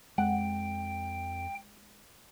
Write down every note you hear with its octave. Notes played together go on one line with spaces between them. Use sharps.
F2 G#3 F#5 G5